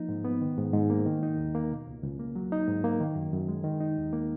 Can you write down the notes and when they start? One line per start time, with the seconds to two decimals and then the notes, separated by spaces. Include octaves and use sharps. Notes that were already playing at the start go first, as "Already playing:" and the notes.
Already playing: F3 A#3 D#4
0.09 G#2
0.24 B3
0.41 D#3
0.57 G#2
0.73 G#2
0.90 A#3
1.06 D#3
1.23 D#4
1.38 D#2
1.55 A#3
1.71 B2
1.87 C#2
2.04 C#2
2.19 A#3
2.35 F#3
2.52 D#4
2.68 G#2
2.84 A#3
3.00 D#3
3.16 F#2
3.33 F#2
3.48 G#3
3.64 D#3
3.80 D#4
3.98 D#2
4.13 A#3